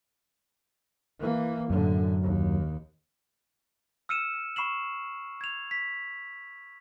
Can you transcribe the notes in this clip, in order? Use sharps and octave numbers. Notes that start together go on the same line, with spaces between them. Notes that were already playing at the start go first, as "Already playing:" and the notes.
E3 A#3
F#2 A2 D3
D#2
E6 F6 C#7 D#7 E7
B5 C#6 C7 E7 F#7
G#6 F7
B6